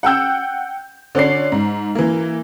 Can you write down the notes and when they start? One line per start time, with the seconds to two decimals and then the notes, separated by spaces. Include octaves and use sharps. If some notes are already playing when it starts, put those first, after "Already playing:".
0.03 F#5 G5 E6 G6
1.15 D3 C#4 D5 C7
1.52 G#2
1.95 E3 A#3